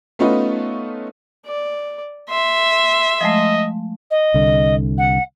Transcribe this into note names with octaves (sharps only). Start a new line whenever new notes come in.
A3 B3 C#4 D#4 F4 B4
D5
E5 C6
F3 G#3 A3 D#5
D#5
C2 D3
F#5